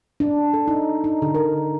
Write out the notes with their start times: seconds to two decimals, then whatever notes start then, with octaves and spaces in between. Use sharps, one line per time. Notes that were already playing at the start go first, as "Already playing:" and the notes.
0.20 D4
0.54 A4
0.68 D#4
1.04 D#4
1.22 D3
1.34 A#4